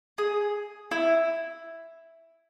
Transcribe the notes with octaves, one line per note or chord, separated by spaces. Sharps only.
G#4
E4